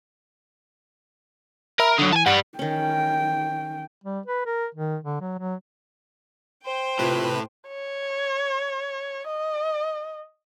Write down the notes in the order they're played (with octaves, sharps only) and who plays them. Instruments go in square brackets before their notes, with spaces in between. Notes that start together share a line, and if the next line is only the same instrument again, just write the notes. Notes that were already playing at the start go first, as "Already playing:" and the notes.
[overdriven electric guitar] A#4 [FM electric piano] E5 A#5 B5
[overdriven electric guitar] D3 F#3 [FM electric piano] D#6
[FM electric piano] E3 [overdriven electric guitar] G#5 A5
[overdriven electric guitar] G2 G3 [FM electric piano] F#5
[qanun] D#3 C#4 [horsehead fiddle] G5
[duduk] G3
B4
A#4
D#3
D3
F#3
F#3
[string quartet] C5 G5
[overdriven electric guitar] A2 [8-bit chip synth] C3 B4 [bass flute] F4
[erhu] C#5
D#5